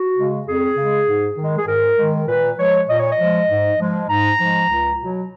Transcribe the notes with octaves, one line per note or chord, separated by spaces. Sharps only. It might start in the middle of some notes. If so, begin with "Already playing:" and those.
Already playing: F#4
C#3 G#3
F2 G#4
C#3 G#3
G#2
D#3 G#3
G#4
G#2 A#4
D#3 G#3
A#2 B4
F3 G#3 C#5
A#2 D#5
C#5
D#5
F3 G#3
G#2
F3 G#3
G#2 A#5
F3 G#3
C#2
B2 F#3